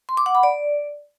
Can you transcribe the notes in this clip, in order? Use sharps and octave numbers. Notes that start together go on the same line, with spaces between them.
C6
D6
F#5
B5
D5